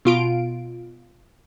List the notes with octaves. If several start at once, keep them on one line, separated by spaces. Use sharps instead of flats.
B2 F4 D7